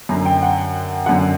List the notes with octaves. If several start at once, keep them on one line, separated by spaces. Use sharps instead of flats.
F#2 D3 A#5
G5
F#5
F#2 D3 F#5